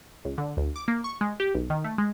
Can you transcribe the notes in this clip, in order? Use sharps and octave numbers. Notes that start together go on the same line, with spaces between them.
C#2
D3
D2
D6
A#3
C#6
G#3
G4
B1
D#3
A3
G#3